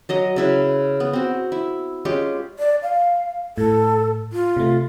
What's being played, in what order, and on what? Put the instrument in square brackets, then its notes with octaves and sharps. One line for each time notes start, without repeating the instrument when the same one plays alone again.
[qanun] F#3 D#5 A#5
C#3 E4 B4
B3
C4 F#4
E4
G#3 C#4 F4 G4
[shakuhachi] D5
F5
[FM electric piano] A2 [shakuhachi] A4
[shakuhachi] F4
[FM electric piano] C3 A3